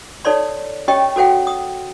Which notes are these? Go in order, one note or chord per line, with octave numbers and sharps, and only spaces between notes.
D#4 A4 C#5 D5 C6
C#4 G4 C#5 D#5 G5
F#4 A4 C5 F#5 G5
D#6